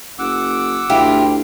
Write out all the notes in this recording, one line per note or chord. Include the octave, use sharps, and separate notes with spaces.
F#1 F#5 D6 E6
D2 E4 F4 G4